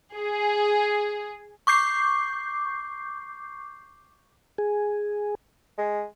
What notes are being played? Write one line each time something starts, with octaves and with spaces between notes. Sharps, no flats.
G#4
C#6 D6 G6 C7
G#4
G#3